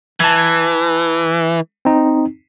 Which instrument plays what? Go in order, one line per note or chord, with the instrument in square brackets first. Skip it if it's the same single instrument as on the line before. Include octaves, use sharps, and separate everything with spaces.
[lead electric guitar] E3 [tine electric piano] A5 G#6
[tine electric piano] C4 D#4